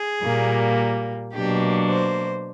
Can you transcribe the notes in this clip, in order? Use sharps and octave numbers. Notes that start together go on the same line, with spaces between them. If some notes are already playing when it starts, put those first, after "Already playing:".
Already playing: G#4
A#2 G3 A#3
B2 F#3 A#3 D4 G4
C5